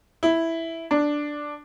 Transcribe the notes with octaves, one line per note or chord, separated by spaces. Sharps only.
E4
D4